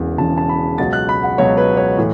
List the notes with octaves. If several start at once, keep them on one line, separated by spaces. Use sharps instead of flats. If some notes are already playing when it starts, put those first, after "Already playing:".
Already playing: E1 E2 C#3 E3
E1 E2 C#3 E3 A5
A5
B5
C#2 B2 F#3 A6
F#6
B5
F#5
C#2 B2 F#3 C#5
B4
C#5
A2 E3